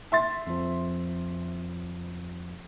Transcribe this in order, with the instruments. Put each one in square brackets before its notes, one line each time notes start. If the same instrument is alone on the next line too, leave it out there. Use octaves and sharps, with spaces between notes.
[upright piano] E5 C6 A6
[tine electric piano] F2 F3